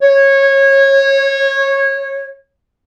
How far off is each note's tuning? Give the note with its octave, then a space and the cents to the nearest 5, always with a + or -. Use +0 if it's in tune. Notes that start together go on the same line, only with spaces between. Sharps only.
C#5 -20